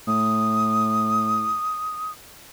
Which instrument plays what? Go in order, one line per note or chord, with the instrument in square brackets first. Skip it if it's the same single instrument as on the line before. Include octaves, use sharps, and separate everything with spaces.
[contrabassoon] A2 [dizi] D#6